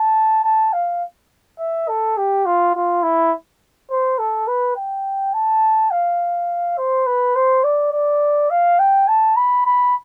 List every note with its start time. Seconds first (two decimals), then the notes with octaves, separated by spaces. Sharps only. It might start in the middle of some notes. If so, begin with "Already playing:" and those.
Already playing: A5
0.44 A5
0.73 F5
1.59 E5
1.88 A4
2.17 G4
2.46 F4
2.75 F4
3.03 E4
3.90 C5
4.19 A4
4.47 B4
4.76 G5
5.34 A5
5.91 F5
6.78 C5
7.06 B4
7.35 C5
7.64 D5
7.92 D5
8.50 F5
8.79 G5
9.08 A5
9.36 B5
9.65 B5